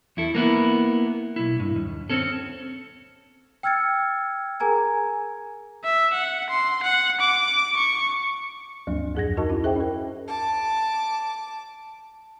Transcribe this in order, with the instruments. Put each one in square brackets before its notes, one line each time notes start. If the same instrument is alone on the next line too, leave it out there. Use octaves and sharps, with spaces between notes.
[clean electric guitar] E2 E4 A4
A#3 B3 E4
B1 E4
G2
D#2
C4 C#4 A4
[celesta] G5 E6 F6 G#6 A6 C#7
G#4 A#4 G#5 A#5 G#6
[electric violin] E5
F#5
C6
F#5
D6
C#6
[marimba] D2 G2 F3 F#3 A#3 D4
F2 G#2 G#4 F#5 G#6 A#6
D#4 F#4 A#4 D#5 A5 C#6
C#4 E4
G#4 C5 D#5 E5 F#5 G5
C#4 A#4
[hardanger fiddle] A5 D6